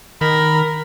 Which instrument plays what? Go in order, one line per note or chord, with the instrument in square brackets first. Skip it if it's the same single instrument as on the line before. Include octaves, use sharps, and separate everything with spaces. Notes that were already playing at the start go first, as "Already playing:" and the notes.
[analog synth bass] D#3 [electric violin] A#4 [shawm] B5